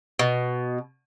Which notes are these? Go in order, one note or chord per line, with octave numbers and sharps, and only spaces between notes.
B2